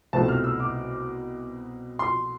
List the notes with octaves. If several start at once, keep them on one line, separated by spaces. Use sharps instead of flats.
C2 B2 A3 C4 A5
F6
E6
D6
C6